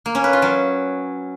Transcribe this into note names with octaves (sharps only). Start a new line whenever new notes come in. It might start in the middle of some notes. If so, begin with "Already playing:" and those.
A#3
C#4
B4
F4
F#3